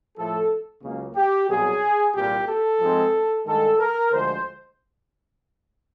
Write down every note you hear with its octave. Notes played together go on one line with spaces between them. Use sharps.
A2 F3 A3 A4
C#2 C#3 F#3 A#3
G4
C2 B2 F#3 G#4
C2 A#2 G3 G4
A4
G#2 F3 G#3 C4
G2 D#3 G#3 A4
A#4
D2 D3 F3 G#3 C5